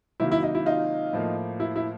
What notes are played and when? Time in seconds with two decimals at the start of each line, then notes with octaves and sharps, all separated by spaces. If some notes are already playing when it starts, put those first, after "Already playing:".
0.20 C3 D#3 F#3 A#3 E4
0.32 E4
0.43 D#4
0.55 E4
0.66 D#4 F4
1.13 A2 F3 A#3
1.60 E4
1.76 E4